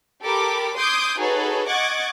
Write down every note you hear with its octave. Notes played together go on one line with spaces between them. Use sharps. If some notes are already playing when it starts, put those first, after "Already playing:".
G4 A4 A#4 B5 D6
C6 D6 D#6 G6 G#6 D7
D#4 F#4 G#4 A4 B4 C#5
D#5 F#5 C#6 D6 G#6 A6